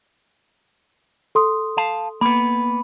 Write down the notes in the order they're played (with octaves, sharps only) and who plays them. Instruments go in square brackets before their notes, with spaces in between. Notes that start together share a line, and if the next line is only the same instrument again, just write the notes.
[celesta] A4 C6 D#6
[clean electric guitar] F5 A5
[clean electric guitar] A#3 B3 [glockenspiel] B5